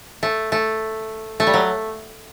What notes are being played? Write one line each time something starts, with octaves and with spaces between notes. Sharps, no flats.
A3
A3
A3
G3
F#3